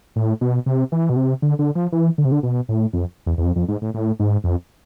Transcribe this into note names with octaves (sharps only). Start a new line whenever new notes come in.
A2
B2
C3
E3
B2
C3
D3
D3
F3
E3
D3
C3
D3
B2
A2
F2
E2
E2
F2
F2
G#2
A2
A2
G#2
F2